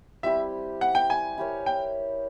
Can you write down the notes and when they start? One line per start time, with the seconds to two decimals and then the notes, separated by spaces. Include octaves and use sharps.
0.23 G3 C4 E4 G4 E5
0.81 F#5
0.95 G5
1.10 G#5
1.38 E4 G4 A#4 C#5
1.66 G5